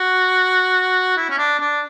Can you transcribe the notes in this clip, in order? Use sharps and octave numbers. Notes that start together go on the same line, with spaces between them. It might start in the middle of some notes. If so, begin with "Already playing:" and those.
Already playing: F#4
E4
C#4
D4
D4